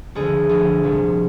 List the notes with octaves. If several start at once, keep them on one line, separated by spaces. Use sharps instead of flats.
D2 D3 F3 G#4
D2 D3 F3 G#4
C2 A#2 F3